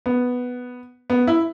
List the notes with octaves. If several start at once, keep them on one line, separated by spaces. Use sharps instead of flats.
B3
B3
E4